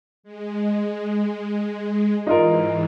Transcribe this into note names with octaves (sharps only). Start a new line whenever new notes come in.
G#3
G#2 E3 D#4 F4 A#4